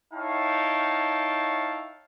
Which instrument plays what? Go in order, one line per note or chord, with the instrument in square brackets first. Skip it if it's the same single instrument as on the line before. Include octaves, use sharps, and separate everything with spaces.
[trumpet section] D#4 E4 C#5 F5 G5 A5